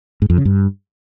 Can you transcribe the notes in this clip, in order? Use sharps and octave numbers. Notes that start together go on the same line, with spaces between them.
G#2
F2
C#3
G2